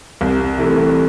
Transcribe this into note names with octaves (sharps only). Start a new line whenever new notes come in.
C2
C3 E3 A3